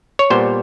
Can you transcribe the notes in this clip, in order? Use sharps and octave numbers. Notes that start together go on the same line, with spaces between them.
C#5
A#2 G3 B3 C5